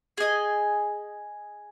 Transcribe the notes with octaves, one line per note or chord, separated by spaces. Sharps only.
G#4 D#5 G#5